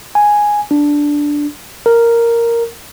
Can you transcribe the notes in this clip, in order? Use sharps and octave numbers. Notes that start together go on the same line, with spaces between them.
G#5
D4
A#4